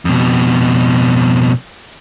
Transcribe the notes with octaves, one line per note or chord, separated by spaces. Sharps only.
F2 B2